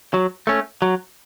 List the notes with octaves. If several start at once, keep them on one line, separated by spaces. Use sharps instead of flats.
F#3
A3 C#4
F#3